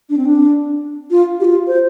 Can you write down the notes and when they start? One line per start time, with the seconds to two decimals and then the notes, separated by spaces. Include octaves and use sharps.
0.10 D4
0.17 C4
0.26 D4
1.11 F4
1.40 G4
1.45 F4
1.67 C5